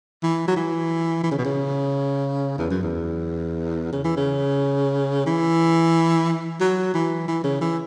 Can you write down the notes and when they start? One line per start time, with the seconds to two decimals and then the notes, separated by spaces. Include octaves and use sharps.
0.23 E3
0.48 F#3
0.56 E3
1.24 E3
1.31 C#3
1.38 B2
1.45 C#3
2.58 E2
2.71 F#2
2.83 E2
3.93 C#3
4.04 E3
4.17 C#3
5.26 E3
6.60 F#3
6.94 E3
7.28 E3
7.44 C#3
7.61 E3